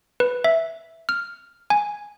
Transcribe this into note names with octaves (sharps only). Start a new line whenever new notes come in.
B4
E5
F6
G#5